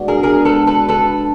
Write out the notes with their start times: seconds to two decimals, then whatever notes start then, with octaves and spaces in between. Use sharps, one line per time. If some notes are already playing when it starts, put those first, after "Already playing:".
Already playing: G#3 B3 D4 F#4
0.08 G#4 A#4
0.23 G#4 A#4
0.45 A4 B4
0.67 A4 B4
0.89 A4 B4